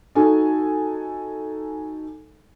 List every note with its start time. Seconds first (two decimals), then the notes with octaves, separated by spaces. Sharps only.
0.15 D#4 F#4 A4 G#5